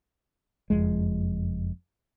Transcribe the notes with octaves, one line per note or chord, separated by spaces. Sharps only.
F#1 F2 G#3